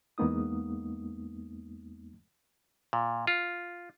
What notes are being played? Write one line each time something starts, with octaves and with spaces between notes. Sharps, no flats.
E2 G#3 A#3 B3 D#4 D#6
A#2
F4